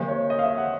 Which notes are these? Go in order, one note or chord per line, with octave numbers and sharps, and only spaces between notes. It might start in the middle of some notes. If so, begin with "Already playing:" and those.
Already playing: D3 F3 A#3 C5
C#5
D#5
F5
E5
F#5